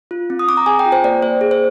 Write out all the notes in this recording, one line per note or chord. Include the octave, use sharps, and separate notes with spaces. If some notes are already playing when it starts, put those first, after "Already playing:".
F4
C4
D#6
C4 D6
A#5
G#4 G#5
G5
F4
C5
A#3 D5
A#3 C5
G#4
C5